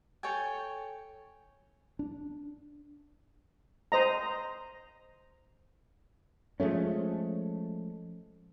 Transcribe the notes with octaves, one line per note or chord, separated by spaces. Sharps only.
A4 C#5 G5 G#5
D4
C5 D#5 A#5
F3 G#3 A3 C#4